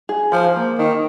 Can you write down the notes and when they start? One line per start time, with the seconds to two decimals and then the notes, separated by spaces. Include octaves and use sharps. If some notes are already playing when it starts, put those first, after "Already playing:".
0.09 G#4
0.32 F3 C5
0.56 A#3
0.79 D#3 D#4